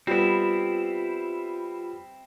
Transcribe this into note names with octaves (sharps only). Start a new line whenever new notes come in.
G3 B3 C4 E4 F4